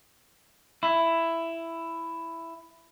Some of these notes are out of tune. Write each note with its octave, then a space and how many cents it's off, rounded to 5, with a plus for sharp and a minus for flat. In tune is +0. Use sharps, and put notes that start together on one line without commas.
E4 +10